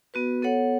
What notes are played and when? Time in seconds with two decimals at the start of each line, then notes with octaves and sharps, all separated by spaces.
0.14 B3 F#4 B4
0.42 B3 A4 C#5 F#5